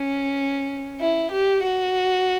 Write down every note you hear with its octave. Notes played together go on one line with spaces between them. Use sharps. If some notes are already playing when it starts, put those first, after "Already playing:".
Already playing: C#4
E4
G4
F#4